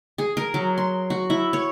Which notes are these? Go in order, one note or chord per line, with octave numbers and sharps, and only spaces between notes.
G#4
A#4
F#3
C6
F#4
E4
C#5